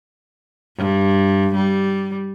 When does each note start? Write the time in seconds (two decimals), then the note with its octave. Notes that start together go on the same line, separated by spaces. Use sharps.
0.77 G2
1.55 G3